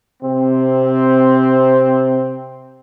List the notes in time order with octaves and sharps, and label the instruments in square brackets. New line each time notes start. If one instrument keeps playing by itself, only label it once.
[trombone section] C3 C4